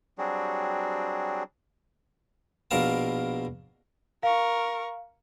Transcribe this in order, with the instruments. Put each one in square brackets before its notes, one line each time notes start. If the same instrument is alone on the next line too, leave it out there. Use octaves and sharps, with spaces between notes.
[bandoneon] F#3 G3 C4 D4 F#4 G#4
[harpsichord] A#1 B2 A#4 F5 A5
[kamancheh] A#4 C#6 [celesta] F5